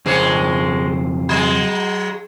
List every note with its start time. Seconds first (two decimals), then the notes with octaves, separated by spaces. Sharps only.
0.06 F2 C#3 G#3 C5 C#5
1.29 F#3 G#3